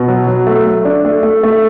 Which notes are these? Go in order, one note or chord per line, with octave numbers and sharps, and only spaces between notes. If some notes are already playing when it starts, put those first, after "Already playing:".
Already playing: B2
F#3
F#3
A3
A3
D4
A3
A3
A3